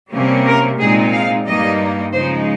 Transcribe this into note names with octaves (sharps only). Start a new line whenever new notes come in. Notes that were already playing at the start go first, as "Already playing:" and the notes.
C3 G3 A#3 C#4
A#4
A#2 G#3 C4 D#4 G#4
F5
G2 G3 A#3 D#4 D#5
C#3 F3 G#3 D#4 C5